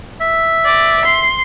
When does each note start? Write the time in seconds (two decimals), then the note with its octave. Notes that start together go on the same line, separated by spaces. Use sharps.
0.21 E5
0.65 D5
1.04 C6